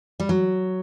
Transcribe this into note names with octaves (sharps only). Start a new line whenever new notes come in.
G3
F#3